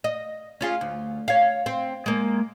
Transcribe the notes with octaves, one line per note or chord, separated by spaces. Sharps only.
D#5
C#4 F4 G#4
D2
C#5 F5
C4
G#3 A#3